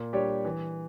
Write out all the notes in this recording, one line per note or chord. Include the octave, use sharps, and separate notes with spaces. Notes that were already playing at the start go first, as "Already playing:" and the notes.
Already playing: A#2
G3 D4 G4 C#5
E3